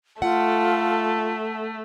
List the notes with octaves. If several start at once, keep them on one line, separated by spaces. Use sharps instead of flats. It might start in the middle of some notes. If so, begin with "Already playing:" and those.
A3 F4 A4 F#5